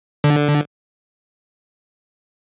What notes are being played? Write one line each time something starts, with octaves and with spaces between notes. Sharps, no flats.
D3